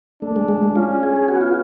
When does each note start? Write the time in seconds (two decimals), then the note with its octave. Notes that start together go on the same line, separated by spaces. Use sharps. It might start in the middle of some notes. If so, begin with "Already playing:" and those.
0.22 A3 D4
0.36 G#3
0.48 G#3
0.63 G#3
0.76 C#4 F4
1.03 G#4
1.16 G#4
1.28 B3 F#4
1.41 F4